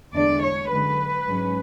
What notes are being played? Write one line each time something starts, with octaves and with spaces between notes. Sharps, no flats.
E2 D3 G#3 D4 D5
C#5
F#2 D3 G#3 B4
G#2 F#3 C#4